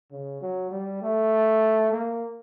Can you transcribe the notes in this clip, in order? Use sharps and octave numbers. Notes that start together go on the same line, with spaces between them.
C#3
F#3
G3
A3
A#3